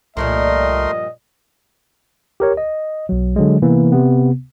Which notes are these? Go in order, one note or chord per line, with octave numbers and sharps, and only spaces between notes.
C2 G2 A#2 F3 A3 A#4 D#5 C6
G4 A#4 C#5
D#5
B1 F#3
D3 F#3 G#3
C3 E3 A#3 B3
C3 B3